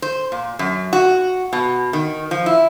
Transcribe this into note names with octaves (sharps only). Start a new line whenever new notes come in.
C5
A#2
F#2
F#4
B2
D#3
F3
E4